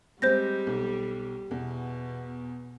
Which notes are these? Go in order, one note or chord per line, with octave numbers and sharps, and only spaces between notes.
G3 G#3 C4 C5 G6 A#6
B1
E2 B2